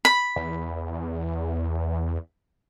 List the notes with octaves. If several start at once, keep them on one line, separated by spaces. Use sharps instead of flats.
B5
E2